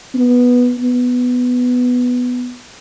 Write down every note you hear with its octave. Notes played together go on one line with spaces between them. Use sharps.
B3
B3